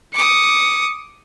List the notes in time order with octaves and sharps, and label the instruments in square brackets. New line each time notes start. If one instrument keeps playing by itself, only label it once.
[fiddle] D6 D#6 [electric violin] C#7